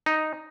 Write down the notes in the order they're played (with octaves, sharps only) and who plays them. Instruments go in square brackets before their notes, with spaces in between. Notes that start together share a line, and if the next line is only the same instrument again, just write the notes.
[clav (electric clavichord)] D#4